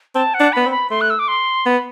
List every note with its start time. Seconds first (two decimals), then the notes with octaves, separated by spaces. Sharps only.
0.15 C4 A5
0.34 F#5
0.40 D4
0.53 B3 B5
0.66 C4
0.71 B5
0.90 A3 C6
1.01 F#6
1.10 E6
1.19 D6
1.28 C6
1.66 B3 B5